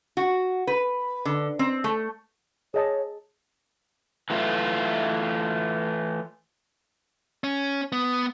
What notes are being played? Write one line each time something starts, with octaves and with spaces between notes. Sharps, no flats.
F#4
B4
D3
C4
A3
G#4 C#5 D#5 A5
E3 A3 F4
C#4
B3